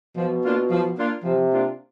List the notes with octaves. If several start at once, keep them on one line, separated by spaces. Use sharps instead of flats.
B2 F3
A#3 D4 F4
F3
A#3 D4 F4
C3 F3
A#3 D4 F4